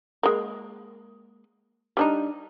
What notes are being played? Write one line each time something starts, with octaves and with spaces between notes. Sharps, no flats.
G#3 A#3
G3 D4 D#4